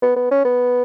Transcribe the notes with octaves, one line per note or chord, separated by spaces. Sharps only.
B3
B3
C#4
B3